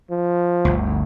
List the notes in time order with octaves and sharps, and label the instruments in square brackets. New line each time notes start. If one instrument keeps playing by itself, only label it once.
[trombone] F3
[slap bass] G1 D2